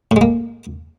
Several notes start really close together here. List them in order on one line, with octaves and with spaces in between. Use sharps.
A2 G#3 A#3